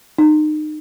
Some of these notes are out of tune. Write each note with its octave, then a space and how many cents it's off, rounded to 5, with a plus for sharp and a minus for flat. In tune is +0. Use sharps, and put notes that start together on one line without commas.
D#4 -30